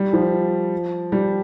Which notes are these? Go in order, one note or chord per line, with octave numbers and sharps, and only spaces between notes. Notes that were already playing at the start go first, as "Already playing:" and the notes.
Already playing: G3
F3
G3